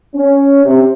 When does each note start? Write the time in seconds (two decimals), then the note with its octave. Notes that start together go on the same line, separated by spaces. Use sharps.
0.15 C#4
0.65 C3